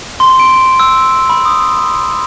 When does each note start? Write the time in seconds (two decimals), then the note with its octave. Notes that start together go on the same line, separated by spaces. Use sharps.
0.20 C6
0.40 D7
0.80 E6
1.30 B5
1.46 D#6